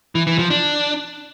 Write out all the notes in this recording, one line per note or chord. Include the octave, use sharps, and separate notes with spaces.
E3
E3
F3
D4